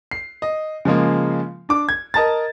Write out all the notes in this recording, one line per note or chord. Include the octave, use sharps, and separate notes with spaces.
C7
D#5
C#3 F3 G#3 A#3
D4 D6
G#6
A#4 D#5 A5 A#5 A6